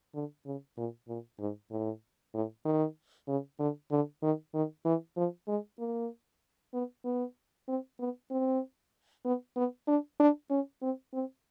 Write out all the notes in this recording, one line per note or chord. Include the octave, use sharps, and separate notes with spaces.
D3
C#3
A#2
A#2
G#2
A2
A2
D#3
C#3
D3
D3
D#3
D#3
E3
F3
G#3
A#3
B3
B3
C4
B3
C4
B3
B3
D4
D4
C#4
C4
C4